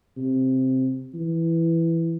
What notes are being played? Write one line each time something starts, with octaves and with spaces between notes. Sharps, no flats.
C3
E3